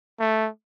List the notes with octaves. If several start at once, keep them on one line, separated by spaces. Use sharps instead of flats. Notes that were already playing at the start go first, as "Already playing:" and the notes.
A3